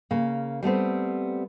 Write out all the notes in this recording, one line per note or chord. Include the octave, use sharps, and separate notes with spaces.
C#3 A#3
G3 A3 B3 C4